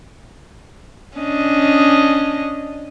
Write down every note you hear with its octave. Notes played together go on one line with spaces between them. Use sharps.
C#4 D4 D#5